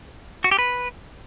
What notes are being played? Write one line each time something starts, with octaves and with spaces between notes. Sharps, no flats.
F#4
G4
B4